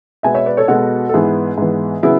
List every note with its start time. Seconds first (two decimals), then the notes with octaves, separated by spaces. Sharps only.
0.23 B2 G#3 B3 E5 G#5
0.34 C#5 E5
0.46 B4 D5
0.57 A4 C#5
0.68 B2 G#3 B3 F#4 A4
1.09 A4
1.14 G#2 E3 B3 E4 G#4
1.58 G#2 E3 B3
2.03 C#3 F#3 B3 E4 G#4